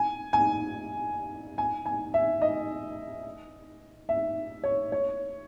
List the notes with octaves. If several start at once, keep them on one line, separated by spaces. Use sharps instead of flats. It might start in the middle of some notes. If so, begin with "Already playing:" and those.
Already playing: G#5
G#5
G#5
G#5
E5
D#5
E5
C#5
C#5